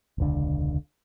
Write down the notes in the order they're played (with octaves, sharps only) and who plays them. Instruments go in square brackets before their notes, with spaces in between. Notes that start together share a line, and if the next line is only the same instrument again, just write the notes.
[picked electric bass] E1 C#2 D3